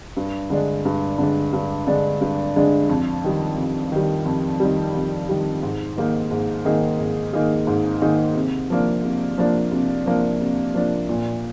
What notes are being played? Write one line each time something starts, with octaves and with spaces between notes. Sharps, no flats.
G2
D3 G#3 D4
G2
D3 G#3 D4
G2
D3 G#3 D4
G2
D3 G#3 D4
F2
D#3 G3
F2
D#3 G3
F2
D#3 G3
F2
D#3 G3
G#2
D#3 A#3 D#4 G#4
G#2
D#3 A#3 D#4 G#4
G#2
D#3 A#3 D#4 G#4
G#2
D#3 A#3 D#4 G#4
C3
F3 A#3 D4
C3
F3 A#3 D4
C3
F3 A#3 D4
C3
F3 A#3 D4
A#2